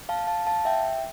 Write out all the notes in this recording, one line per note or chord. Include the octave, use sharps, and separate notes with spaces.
F5 A5
F5 A5
F5 A5
E5 G5